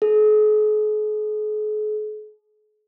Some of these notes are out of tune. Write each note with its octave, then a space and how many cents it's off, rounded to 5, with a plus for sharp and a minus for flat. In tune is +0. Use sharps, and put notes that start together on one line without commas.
G#4 +45